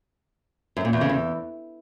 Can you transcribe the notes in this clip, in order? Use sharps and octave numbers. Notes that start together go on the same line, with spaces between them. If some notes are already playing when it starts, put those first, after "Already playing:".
F#2
A#2
E2
C#3
E2